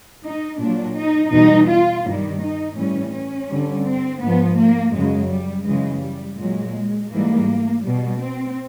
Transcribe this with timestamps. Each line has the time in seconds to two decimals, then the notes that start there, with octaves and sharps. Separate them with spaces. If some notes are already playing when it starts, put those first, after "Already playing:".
0.25 D#4
0.60 A#2 F#3 D4
0.97 D#4
1.33 E2 B2 G3 D#4
1.70 F4
2.06 G2 D#3 G3
2.42 D#4
2.78 A2 E3 G3 C#4
3.14 C#4
3.50 G2 D3 G3
3.86 C4
4.22 G#2 F3 B3
4.58 A#3
4.95 F#2 C#3 F#3 G#3
5.31 G3
5.67 F#2 C#3 E3 G#3
6.03 G3
6.39 A#2 F#3 G#3
7.11 G#2 E3 G3 A#3
7.84 B2 G3
8.20 C4